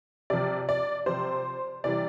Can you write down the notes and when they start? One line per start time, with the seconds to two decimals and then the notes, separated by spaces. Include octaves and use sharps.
0.30 C3 F3 D5
0.69 D5
1.06 C3 F3 C5
1.84 C3 E3 G3 D5